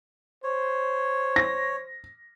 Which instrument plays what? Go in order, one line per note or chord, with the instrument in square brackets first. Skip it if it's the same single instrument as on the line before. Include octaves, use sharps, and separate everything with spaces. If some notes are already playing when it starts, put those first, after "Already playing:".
[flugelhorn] C5 [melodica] C#5
[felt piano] A#6